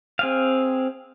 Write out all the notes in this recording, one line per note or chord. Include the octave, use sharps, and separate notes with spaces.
C4 G#4 F5